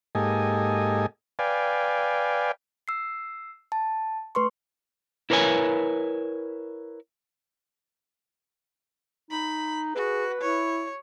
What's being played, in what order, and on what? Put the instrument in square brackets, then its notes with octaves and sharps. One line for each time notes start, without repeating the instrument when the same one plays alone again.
[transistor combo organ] G#2 A#3 G4 A4 D#5 G#5
B4 D5 F5 G5 G#5
[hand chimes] E6 C7
A5
A3 B4 C6 C#6
[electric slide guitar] E4 A#4 B4 C#5 G#5
[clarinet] D#4 [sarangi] B5
[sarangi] F#4 [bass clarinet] G#4 [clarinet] B4
[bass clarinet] E4 [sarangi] C#5